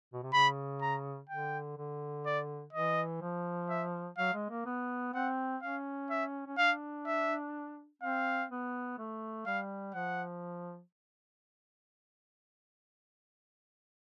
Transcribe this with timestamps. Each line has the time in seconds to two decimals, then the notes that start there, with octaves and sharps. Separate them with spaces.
0.13 B2
0.23 C3
0.33 C#3 B5
0.82 A#5
1.29 D3 G5
1.77 D3
2.26 D5
2.73 E3 D#5
3.22 F3
3.70 E5
4.18 F#3 F5
4.34 G#3
4.50 A#3
4.66 B3
5.14 C4 F#5
5.62 C#4 F5
6.10 E5
6.47 C#4
6.58 D4 F5
7.06 E5
8.02 C4 F5
8.51 B3
8.99 A3
9.46 G3 F5
9.94 F3 F#5